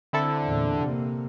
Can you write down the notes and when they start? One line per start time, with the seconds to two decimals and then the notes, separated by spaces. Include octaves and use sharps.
0.13 D3 C4 E4 A4
0.44 E2 A#2
0.79 C3 A#3